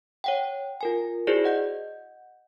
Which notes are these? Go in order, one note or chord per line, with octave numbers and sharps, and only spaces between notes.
C#5 F#5 G5
F4 A#4 G#5
E4 F#4 G#4 C5 D5
D#5 F#5 G6